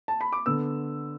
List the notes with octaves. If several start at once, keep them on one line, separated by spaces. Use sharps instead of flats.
A5
B5
D6
D3 B3 E6